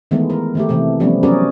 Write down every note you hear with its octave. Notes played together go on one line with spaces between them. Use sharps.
D#3 E3 G#3 A3 B3
A#4
D#3 A3 G4
C3 E3 A3
F3 G3 A3 B3 C#4
F#3 C#4 F#4 G#4 A#4 D5